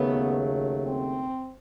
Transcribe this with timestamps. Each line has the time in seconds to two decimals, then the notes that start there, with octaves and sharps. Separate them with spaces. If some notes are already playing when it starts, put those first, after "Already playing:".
Already playing: D#2 C#3 F#3 A3 B3
0.86 C4